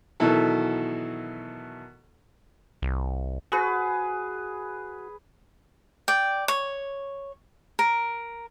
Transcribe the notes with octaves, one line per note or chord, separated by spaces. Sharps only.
B2 D#3 E3 F#3 E4 A4
C2
F#4 G#4 B4
D5 G5
C#5
A#4